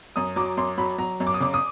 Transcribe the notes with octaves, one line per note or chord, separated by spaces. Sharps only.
F#2 D#6
F#3 D6
F#2 C6
F#3 B5
F#3 A#5
F#2
D6
D#6
C#3 D6
D#6